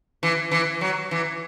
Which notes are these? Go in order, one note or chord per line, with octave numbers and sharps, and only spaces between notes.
E3
E3
F#3
E3